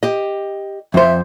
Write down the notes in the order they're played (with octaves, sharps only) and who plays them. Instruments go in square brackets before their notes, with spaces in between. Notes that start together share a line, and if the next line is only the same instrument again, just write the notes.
[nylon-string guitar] G4 D#5
[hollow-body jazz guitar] F2 C5 [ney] E5